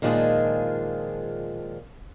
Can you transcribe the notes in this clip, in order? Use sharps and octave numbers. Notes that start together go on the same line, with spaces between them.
A#2 D#3 F3 G#3 D4 G#4